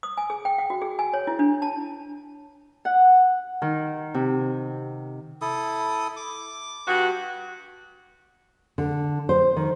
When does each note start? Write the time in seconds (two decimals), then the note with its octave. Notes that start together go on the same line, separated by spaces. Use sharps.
0.03 D#6
0.18 G#5
0.30 G#4
0.45 G5
0.58 F#5
0.70 F#4
0.82 G#4
0.99 G#5
1.14 C#5
1.27 E4
1.39 D4
1.62 A5
2.85 F#5
3.62 D#3
4.14 C3
5.42 E4 A4 D#6
6.16 D6
6.87 G2 F#4
8.78 D3
9.29 C5
9.56 D#3